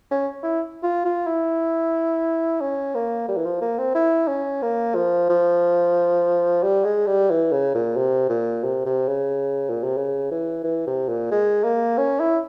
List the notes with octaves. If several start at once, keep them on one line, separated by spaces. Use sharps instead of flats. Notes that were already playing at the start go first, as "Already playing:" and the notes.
C#4
E4
F4
F4
E4
C#4
A#3
G3
E3
F3
A#3
C4
E4
C#4
A#3
F3
F3
G3
G#3
G3
E3
C#3
A#2
C3
A#2
C3
C3
C#3
A#2
C3
C#3
E3
E3
C3
A#2
G#3
A#3
C#4
E4